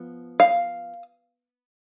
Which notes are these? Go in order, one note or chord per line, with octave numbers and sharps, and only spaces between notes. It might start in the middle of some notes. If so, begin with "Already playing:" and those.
Already playing: F3 B3
F5